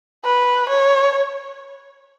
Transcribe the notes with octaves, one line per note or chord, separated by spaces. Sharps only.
B4
C#5